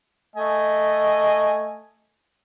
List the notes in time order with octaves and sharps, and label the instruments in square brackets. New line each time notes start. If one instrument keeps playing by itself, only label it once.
[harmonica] A3 D#5 G#5